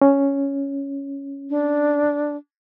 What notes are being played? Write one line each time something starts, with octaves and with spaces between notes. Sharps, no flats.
C#4
D4